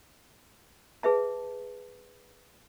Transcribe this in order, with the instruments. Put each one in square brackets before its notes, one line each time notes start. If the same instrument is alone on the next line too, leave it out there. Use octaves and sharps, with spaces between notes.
[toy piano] G#4 B4 E5 A5